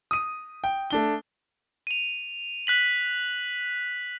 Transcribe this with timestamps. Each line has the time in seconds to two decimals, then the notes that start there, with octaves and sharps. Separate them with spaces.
0.11 D#6 D#7
0.64 G5
0.90 A3 D4 G7
1.87 D#7 F7
2.67 F#6 B6 F#7